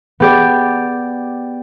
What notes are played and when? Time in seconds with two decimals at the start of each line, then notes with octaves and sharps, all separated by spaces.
0.20 B3 G4 D5